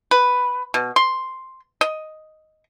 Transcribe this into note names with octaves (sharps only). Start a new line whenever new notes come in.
B4
B2
C6
D#5